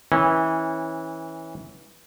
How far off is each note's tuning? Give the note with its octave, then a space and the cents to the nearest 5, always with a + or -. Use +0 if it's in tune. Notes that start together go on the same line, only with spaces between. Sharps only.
E3 -20 C#4 -20